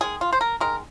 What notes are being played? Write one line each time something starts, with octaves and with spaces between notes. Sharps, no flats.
D#3 G#3 G#4
F4
C5
A#4
D#3 G#3 A#4